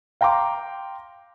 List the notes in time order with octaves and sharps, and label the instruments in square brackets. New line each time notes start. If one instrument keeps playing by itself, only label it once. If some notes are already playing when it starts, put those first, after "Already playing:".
[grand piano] F5 G5 A#5 C6 D6